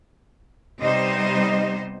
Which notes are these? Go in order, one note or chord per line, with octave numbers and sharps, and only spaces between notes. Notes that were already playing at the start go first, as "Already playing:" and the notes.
C3 G3 B3 D#4 C5 D#5